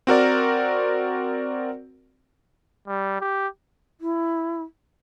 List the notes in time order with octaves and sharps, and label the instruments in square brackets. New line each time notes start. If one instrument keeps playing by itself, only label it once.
[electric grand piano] C4 F#4 A#4 D5
[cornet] G3
G4
[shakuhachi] E4